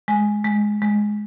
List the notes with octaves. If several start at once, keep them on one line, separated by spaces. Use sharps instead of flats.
G#3 G#5
G#3
G#3